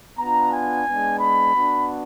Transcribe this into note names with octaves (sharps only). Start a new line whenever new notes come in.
B3 D4 F4 A#5
G#5
G#3 B3 D4
B5
B3 D4 F#4